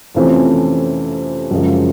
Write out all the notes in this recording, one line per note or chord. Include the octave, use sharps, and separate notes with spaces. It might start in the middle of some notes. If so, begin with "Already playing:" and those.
F2 C3 E3 A3 C#4
F#2 C#3 F3 G#3